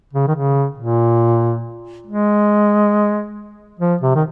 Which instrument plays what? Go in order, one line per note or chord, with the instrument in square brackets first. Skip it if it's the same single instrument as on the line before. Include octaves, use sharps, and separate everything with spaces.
[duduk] C#3
D#3
C#3
A#2
G#3
F3
C3
D#3